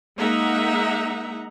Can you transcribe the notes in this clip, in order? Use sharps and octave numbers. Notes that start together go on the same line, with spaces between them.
G#3 A#3 D#4 E5 F#5 A#5